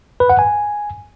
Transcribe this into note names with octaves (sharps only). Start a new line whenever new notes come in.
B4
F#5
G#5